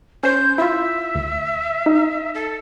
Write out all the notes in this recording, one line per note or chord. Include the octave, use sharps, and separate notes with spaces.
C#4 C5 G6
E4 F4 E5
D2
D#4
A4